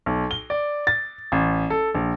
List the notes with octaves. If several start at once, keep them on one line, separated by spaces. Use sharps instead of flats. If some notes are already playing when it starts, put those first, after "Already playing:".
B1
G7
D5
A6
A1
A4
A#1